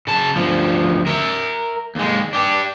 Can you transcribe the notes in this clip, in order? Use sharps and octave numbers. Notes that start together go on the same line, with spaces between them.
C#3 A5
D2 F3
A#4 E5
D#2 G#3
D4 G4